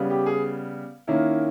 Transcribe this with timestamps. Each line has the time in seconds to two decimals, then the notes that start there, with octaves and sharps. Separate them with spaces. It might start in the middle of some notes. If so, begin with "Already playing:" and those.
Already playing: C#3 G3 B3
0.10 G4
0.26 G#4
1.07 D#3 A#3 C#4 E4